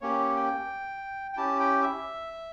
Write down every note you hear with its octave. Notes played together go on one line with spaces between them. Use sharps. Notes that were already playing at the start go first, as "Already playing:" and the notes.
A#3 C#4 G4 C#5
G5
G5
C#4 E4 G4 A5
G5
E5